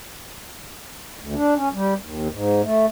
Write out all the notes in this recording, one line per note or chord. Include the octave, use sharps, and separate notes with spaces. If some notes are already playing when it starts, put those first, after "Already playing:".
D2
D4
C#4
G3
D#2
G#2
A3